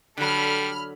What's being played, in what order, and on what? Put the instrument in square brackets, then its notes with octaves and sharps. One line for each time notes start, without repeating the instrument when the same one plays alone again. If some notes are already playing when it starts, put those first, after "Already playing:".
[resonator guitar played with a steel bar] D3 F#3 [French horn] G3 [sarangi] A4 [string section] B5 F6